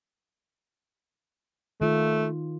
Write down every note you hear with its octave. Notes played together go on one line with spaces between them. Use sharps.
D#3 A3 F4